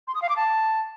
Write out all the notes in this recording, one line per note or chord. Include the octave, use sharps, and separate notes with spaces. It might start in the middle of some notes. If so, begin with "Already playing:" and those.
C6
D#6
F5
D6
A5